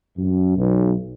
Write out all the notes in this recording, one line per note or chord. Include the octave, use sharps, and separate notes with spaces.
F#2
B1